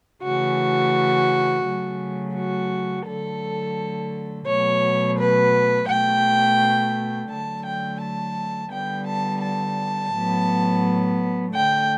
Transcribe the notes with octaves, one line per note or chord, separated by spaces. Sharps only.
C#3 E3 A3 F#4
C#3 F#3 A3
F#4
D3 F#3 A3 A4
B2 F#3 A3 C#5
B4
B2 A3 G5
D3 F#3 A3 A5
G5
A5
D3 G3 B3 G5
A5
A5
A2 F#3 B3
D3 A3 G5